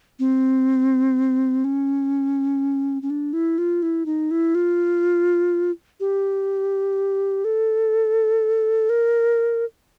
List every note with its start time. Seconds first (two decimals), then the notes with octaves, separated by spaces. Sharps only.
0.19 C4
1.64 C#4
3.02 C#4
3.10 D4
3.33 E4
3.58 F4
3.83 E4
4.06 D#4
4.31 E4
4.55 F4
6.00 G4
7.45 A4
8.90 A#4